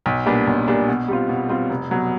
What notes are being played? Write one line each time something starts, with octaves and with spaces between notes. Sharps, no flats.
B1
A#2 G3 B3 D4
B1
A#2 G3 B3 D4
B2
G3 C4 F4
B2
G3 C4 F4
F1
B2 F#3